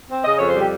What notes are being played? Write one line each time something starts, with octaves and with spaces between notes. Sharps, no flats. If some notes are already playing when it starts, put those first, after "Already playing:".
C4
C#3 D#5
F2 C#5
C5
G3 G4